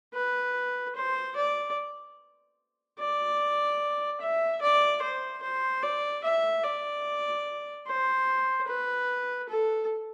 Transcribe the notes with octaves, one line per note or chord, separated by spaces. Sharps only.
B4
C5
D5
D5
E5
D5
C5
C5
D5
E5
D5
C5
B4
A4